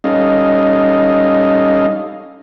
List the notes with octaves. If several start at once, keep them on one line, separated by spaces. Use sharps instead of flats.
G3 C#4 D#4 A4 D#5 F5